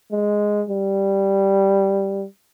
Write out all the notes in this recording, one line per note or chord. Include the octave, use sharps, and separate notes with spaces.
G#3
G3